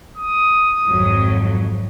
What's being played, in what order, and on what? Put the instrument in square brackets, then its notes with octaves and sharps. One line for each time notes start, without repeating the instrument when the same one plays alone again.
[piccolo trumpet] D#6
[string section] G#1 F2 F#3